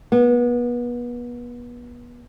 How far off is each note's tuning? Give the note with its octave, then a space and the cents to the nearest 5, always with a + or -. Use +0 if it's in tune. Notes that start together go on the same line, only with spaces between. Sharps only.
B3 -30